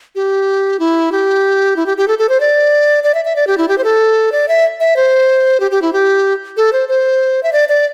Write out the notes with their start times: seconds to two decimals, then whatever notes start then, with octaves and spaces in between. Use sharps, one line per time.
0.15 G4
0.79 E4
1.12 G4
1.76 E4
1.86 G4
1.97 G4
2.08 A4
2.19 A4
2.29 C5
2.40 D5
3.04 D5
3.14 E5
3.25 E5
3.36 D5
3.47 G4
3.58 E4
3.68 G4
3.78 C5
3.84 A4
4.32 D5
4.48 E5
4.80 E5
4.96 C5
5.60 G4
5.71 G4
5.82 E4
5.93 G4
6.57 A4
6.73 C5
6.89 C5
7.43 E5
7.53 D5
7.69 D5